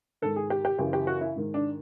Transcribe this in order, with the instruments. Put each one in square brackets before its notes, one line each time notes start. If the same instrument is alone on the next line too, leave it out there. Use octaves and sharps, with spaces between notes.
[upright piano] G#2 D#3 A4
G#4
G4
G4
F#2 C#3 E3 G4
G4
F#4
E4
G#2 D#3
D4